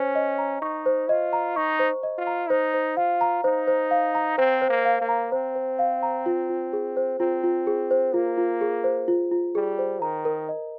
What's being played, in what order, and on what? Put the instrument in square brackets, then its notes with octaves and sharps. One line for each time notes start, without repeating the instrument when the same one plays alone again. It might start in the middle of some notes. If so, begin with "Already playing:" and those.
Already playing: [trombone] C#4 [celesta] C5
[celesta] D#5
A#5
[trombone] D#4 [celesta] C#6
[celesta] C5
[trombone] F4 [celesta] D#5
[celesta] A#5
[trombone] D#4 [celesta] C#6
[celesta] C5
D#5
[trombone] F4
[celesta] A#5
[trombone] D#4 [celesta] C5
[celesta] C5
[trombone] F4 [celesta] F5
[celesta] A#5
[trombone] D#4 [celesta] C5
[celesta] C5
F5
A#5
[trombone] C4 [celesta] C5
[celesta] C5
[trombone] A#3
[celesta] F5
[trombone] A#3
[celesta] A#5
[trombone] C4 [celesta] C5
[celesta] C5
F5
A#5
F4
F4
G#4
C5
[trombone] C4 [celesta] F4
[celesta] F4
G#4
C5
[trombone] A#3 [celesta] F4
[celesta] F4
G#4
C5
F4
F4
[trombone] G3 [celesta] G#4
[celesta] C5
[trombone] D#3 [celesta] A#5
[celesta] A#4
D#5